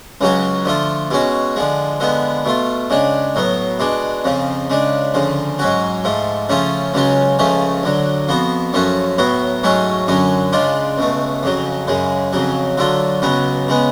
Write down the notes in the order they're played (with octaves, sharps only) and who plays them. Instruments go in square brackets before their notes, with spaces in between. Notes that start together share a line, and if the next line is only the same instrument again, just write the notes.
[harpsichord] C#2 C#3 F#3 C#4 F#4
D3 F3 A3 F4
B2 G#3 C#4 F#4
D3 F3 G#3
D3 F3 G#3 B3
B2 A3 F4
C#3 G#3 D4
A2 F#3 B3
B2 G#3 D4
F2 C#3 F3
C#3 G#3 D4
D2 C#3 F3
G#2 F#3 C#4 F#4
G#2 F3 A3
C#3 F3 A3 C#4 F4
C#2 C#3 F#3 C#4 F4
C#2 C#3 F3 A3 C#4
D2 D3 F#3
F2 F3 B3 F#4
F#2 F3 A3 C#4 F#4
A2 F#3 B3 F#4
G#2 F#3 A3 C#4 F#4
F#2 D3 F#3 C#4
C#3 G#3 D4 F4
C#2 B2 A3
F2 C#3 F#3
F#2 C#3 G#3
F2 C#3 F#3
D3 F#3 A3 F4
C#2 C#3 F#3 B3
C#3 G#3 B3